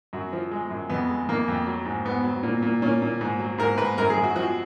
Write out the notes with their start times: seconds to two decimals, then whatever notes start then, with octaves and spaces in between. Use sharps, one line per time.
0.13 F#2 F#4
0.33 F3
0.51 G#3
0.71 F#2
0.90 F2 B3
1.09 G#3
1.28 F2 A#3
1.48 F2
1.67 F#3
1.86 G#2
2.05 G#2 B3
2.24 F#3
2.43 A#2
2.62 A#2
2.82 A#2 C#4
3.02 A#2
3.21 G#2
3.39 F#3
3.58 G#2 A#4
3.78 G#2 B4
3.98 F#2 A#4
4.10 G#4
4.17 F#2
4.24 F#4
4.35 F3 F#4